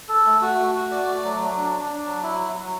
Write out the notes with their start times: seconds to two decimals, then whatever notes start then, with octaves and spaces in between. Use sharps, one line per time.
0.09 A4
0.26 A3
0.42 F#4
0.59 A3
0.75 F#4
0.92 D5
1.07 A3
1.24 F#3
1.40 F#3
1.57 D4
1.73 D4
1.89 D4
2.06 F#3
2.23 E4
2.39 F#3
2.56 F#3